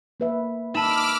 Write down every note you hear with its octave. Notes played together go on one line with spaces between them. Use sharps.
A#3 B4 E5
D#4 A5 B5 D6 E6 F6 E7